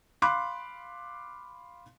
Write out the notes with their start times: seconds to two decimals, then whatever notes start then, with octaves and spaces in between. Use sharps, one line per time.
0.22 F5 B5 C6 D6 F#6